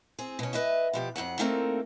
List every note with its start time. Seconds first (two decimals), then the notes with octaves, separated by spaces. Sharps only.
0.19 C4 G#4
0.39 B2 C#4
0.53 B4 D#5 E5
0.93 B2 F3 G4
1.16 F2 G#2 F#3 F#5
1.39 A3 A#3 C4 D#4 A4 A#4